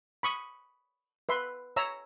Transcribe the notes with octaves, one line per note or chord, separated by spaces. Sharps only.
B5 C#6 D#6
B4 E5 C6
C#5 E5 A#5 E6